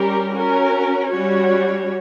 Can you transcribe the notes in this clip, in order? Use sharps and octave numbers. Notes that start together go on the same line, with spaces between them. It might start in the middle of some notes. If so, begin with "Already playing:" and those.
Already playing: G3 C#4 G4 A#4
C#4 F#4 A#4
G3 C#4 F#4 C#5